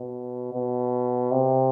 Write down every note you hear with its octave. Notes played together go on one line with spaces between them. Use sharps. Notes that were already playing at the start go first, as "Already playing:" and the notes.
Already playing: B2
B2
C3